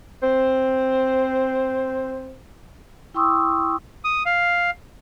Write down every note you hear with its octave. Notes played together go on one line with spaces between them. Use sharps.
C4 C5
E4 G5 C6 C#6 D#6 E6
D#6
F5